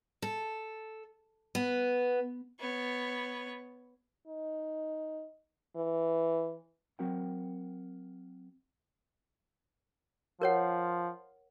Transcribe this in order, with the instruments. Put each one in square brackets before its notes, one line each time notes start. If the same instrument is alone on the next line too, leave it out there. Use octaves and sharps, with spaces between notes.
[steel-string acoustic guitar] A4
B3
[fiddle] B3 C#5
[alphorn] D#4
E3
[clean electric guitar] F#3 C4 F#4 A#4 F#5 G5
[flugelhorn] F3 [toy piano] A#4 C#5 F#5